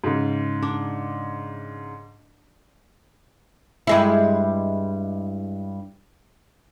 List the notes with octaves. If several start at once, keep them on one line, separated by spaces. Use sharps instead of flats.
G#2 C#3
D4
G2 G#3 E4